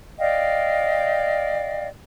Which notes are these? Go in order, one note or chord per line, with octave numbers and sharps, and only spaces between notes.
D5 D#5 F5 G5